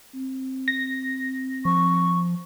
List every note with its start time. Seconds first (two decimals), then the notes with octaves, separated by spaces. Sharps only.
0.14 C4
0.68 A#6
1.65 F3 C#6